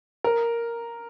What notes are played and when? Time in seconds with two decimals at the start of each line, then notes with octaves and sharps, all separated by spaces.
0.24 A#4